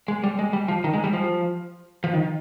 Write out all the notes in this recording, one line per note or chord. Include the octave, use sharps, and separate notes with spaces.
G#3
G3
G#3
G3
F3
D#3
G#3
G3
F3
F3
D#3